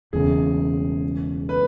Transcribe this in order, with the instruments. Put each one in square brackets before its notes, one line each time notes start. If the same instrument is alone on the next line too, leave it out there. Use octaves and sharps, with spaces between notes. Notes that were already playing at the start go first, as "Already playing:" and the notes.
[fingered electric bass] E1 E2 C#3 [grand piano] G#4
[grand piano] B4